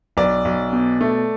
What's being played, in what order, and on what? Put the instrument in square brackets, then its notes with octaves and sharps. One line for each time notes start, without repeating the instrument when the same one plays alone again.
[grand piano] B1 [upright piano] D5
[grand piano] B1
B2
A3